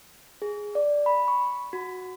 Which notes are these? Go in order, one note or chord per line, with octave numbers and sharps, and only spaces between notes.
G#4
D5
B5
C#6
F#4